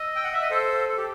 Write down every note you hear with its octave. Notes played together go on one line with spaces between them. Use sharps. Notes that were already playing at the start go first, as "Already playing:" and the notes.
Already playing: D#5 E6
G5
F#5
E5
D#5
A4 C5
A4
G4